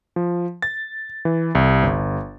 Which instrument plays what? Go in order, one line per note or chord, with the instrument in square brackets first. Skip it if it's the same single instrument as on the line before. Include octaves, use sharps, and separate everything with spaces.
[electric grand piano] F3
A6
E3
C2
G1